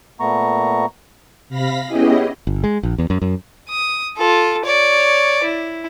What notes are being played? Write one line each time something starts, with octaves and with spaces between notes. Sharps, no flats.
A#2 A3 B3 A#5 C#6
C3 F5 B5 A#6 B6
B3 C#4 E4 G4 G#4 D#5
G1
G#3
A#1
E2
F#2
F#2
D#6
F4 A4
C#5 D5
E4